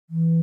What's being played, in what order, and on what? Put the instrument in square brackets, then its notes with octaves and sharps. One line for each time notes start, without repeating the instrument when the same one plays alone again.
[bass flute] E3